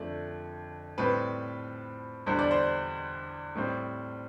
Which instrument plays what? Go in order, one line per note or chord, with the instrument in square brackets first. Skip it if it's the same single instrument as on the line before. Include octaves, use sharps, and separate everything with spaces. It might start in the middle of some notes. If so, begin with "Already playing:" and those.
Already playing: [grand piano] F2 D3 A3 D5
A2 G3 C4 B4
E2 D3 G3 C5
D5
C5
A2 G3 C4